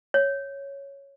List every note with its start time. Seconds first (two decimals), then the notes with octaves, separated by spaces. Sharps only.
0.14 C#5